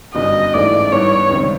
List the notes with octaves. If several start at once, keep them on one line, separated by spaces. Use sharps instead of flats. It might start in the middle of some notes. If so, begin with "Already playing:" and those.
G1 F#2 D3 G3 D#5
A1 G#2 E3 A3 C#4 D5
G2 E3 G3 B3 D#4 C#5
C#2 C3 D#3 G3 C4